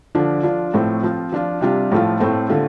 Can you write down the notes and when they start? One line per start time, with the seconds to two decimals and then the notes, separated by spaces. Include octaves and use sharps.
0.15 D3 F3 D4 F4
0.43 F3 D4 F4
0.74 A2 F3 A3 C4
1.03 F3 C4 F4
1.32 F3 D4 F4
1.61 C3 G3 D4 F4
1.92 A2 F3 A3 F4
2.20 A2 A3 C4
2.49 D3 A3 F4